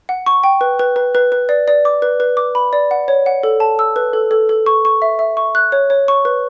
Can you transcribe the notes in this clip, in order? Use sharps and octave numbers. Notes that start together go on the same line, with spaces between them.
F#5
C#6
G5
B4
B4
B4
B4
B4
D5
D5
D6
B4
B4
D6
B5
D5
F#5
C#5
F#5
A4
A5
E6
B4
A4
A4
A4
C#6
C#6
E5
E5
C#6
F#6
C#5
C#5
C#6
B4